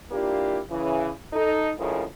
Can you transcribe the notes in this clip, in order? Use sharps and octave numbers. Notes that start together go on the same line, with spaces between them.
A#3 D4 E4 F4 G4
C#3 E3
D#4 A4
D2 A2 C#3 F3 G#3 A#4